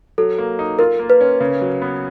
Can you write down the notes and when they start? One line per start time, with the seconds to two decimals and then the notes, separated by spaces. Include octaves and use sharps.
0.18 F#3 A4
0.38 A#3
0.59 D#4
0.79 F4 A#4
0.99 A#3
1.10 B4
1.21 C#4
1.40 C#3
1.61 F#3
1.82 B3